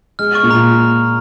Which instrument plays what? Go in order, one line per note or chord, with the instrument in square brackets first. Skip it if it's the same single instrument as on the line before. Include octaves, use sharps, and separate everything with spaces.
[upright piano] G#3 [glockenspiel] F6
[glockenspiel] C#6
[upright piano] A#2
[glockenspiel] A#5